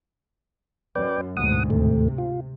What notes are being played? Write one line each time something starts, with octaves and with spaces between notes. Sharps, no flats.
F#2 B4 D5 G5
D2 G#2 B2 F#5 D#6
D#2 A2 C3 A3
F4